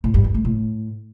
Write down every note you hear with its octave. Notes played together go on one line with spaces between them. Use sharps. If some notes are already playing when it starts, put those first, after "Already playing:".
A2
G2
E3
A3
A2